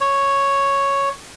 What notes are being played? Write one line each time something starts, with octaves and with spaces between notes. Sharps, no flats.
C#5